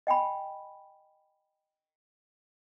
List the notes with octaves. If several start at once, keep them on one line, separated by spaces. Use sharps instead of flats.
D#5 G5 G#5 B5